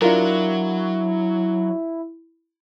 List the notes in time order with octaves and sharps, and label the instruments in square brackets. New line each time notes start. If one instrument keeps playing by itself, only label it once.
[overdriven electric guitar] F#3 [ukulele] D4 F4 A#4 [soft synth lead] E4